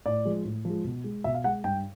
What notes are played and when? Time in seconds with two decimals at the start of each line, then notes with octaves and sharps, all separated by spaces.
0.06 A2 D5
0.25 F3 G#3
0.45 A2
0.65 F3 G#3
0.84 B2
1.04 G#3
1.24 B2 E5
1.34 F5
1.44 G#3 F#5
1.64 G2 G5